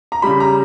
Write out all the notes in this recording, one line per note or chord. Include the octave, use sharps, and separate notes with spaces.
A#5
C#3 G3 B5
A#5